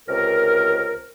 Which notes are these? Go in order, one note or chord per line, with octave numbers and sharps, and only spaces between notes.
C#2 C3 A#4